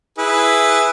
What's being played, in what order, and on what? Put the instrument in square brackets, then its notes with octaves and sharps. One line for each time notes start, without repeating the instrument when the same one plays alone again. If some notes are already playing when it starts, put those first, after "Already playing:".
[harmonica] E4 G#4 B4